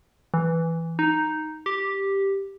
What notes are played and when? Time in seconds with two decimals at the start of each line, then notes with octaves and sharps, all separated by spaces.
0.34 E3
0.99 D#4
1.66 G4